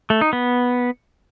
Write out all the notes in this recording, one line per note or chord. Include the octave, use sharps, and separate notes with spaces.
A3
D#4
B3